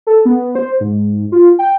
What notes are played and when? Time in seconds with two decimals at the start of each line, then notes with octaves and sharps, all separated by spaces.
0.07 A4
0.25 B3
0.55 C5
0.80 G#2
1.32 F4
1.59 G5